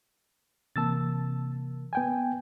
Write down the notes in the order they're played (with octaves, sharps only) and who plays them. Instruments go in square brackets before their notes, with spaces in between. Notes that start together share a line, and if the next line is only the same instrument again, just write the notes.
[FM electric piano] C3 E3 A#3 [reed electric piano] A5 E6 A6
[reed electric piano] B3 G5 G#5